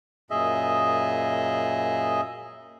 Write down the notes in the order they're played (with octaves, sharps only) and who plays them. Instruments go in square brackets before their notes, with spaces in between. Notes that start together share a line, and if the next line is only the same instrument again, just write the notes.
[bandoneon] F#2 A#2 G#4 D#5 E5